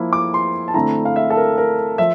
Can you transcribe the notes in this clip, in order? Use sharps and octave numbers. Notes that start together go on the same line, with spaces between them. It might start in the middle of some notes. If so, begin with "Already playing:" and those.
Already playing: F3 A#3 E4
D6
C6
A5
D3 A3 C4 E4 A#5
F5
E5
A4
A#4
A#4
F3 E5